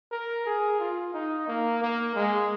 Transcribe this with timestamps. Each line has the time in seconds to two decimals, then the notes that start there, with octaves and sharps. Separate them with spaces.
0.12 A#4
0.46 G#4
0.79 F4
1.14 D#4
1.47 A#3
1.82 A#3
2.15 G#3